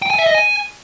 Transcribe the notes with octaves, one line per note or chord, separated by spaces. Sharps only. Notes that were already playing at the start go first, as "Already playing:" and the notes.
G5
G#5
E5
D#5
G#5